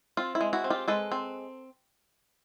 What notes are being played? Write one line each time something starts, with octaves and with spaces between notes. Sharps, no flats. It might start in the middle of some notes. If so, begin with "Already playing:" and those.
C4 F4
E4
G#3
E4 F#4
C4
F4 G4
G#3 A4 B4
C4